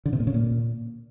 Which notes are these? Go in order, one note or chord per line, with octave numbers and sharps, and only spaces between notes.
D3
C3
A#2
C#3
A#2